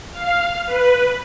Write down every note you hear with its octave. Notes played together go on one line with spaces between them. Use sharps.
F5
B4